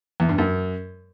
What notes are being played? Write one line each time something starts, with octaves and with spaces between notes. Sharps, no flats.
E2
G2
F#2